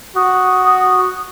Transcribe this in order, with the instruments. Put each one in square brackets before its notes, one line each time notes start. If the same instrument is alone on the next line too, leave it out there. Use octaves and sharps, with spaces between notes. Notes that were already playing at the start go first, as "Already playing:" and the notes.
[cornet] F#4 [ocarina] D#6